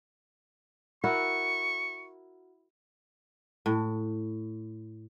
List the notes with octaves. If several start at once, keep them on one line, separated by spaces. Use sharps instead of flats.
E4 F#4 A#4 C#6
A2